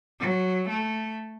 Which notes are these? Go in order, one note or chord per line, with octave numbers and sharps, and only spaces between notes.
F#3
A3